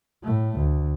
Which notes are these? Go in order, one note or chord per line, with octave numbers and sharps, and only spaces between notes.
A2 A3
D2